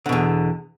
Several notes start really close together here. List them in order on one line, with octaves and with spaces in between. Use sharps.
D3 B2 E2